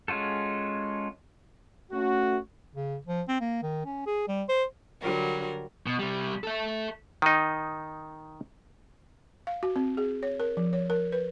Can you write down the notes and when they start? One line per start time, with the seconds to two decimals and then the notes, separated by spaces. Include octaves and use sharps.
0.08 G#3 C#4 F4 F#4 A4
1.92 A3 C#4 F#4
2.75 C#3
3.06 F3
3.28 C4
3.40 A#3
3.62 D#3
3.85 C#4
4.06 G#4
4.28 G3
4.49 C5
5.01 D3 F#3 G3 A#4
5.86 B2
5.99 C3 G3
6.44 A4 E5
7.22 D#3 D#4
9.47 F5
9.63 F#4
9.76 C4
9.97 G#4
10.23 C#5
10.40 A#4
10.57 F3
10.73 C#5
10.90 A#4
11.12 B4